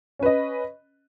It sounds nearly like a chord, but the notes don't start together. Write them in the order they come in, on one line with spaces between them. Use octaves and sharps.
C#4 B4 D#5